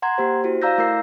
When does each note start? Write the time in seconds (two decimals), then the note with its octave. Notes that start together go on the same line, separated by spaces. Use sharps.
0.02 F#5 A#5 C6 G#6
0.18 A#3 G4 C5
0.44 E4 F#4 C5
0.62 D5 F5 A#5 E6 G6 A#6
0.78 A3 E4 A#4 E6 C7